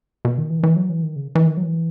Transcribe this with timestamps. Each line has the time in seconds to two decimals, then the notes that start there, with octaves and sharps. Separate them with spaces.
0.25 B2
0.38 D#3
0.50 E3
0.59 D#3
0.63 E3
0.76 F#3
0.90 E3
1.03 D#3
1.16 C#3
1.35 E3
1.46 D#3
1.57 F#3
1.63 E3